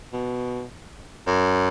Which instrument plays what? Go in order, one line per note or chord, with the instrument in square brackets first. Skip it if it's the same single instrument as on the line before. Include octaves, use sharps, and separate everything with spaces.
[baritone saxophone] B2
F#2